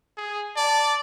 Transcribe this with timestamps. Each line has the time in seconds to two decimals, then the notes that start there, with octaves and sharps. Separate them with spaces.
0.17 G#4
0.56 D5 A5